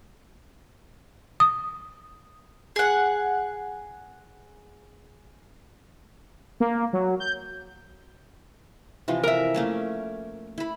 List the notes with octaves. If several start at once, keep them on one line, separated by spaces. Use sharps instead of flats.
D#6
G#4 F#5
A#3
F#3
G6
C3 E3 F3
A#4 E5
A3 A#3 C#4
E4 B5